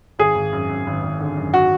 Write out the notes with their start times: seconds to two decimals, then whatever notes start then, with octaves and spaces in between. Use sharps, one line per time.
0.19 G#1 G#4
0.35 G#1
0.52 F#2
0.69 F#2
0.87 G#1
1.03 G#1
1.20 D3
1.37 F#2
1.54 F#4